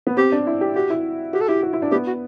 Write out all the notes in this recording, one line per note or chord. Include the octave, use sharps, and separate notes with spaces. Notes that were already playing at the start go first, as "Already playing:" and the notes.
B3
C4 G4
D4
E4
G4
F#4 G4
E4
F#4 G4
A4
E4 G4
F#4
E4
D4
B3 G4
F#4